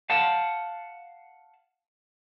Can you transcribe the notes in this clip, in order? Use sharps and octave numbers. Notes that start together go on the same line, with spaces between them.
F5 F#5 A5